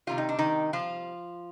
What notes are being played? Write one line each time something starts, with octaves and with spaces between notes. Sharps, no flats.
C3 D#3 G3 F4
D#4
D4
D#3 D#4
F3 F4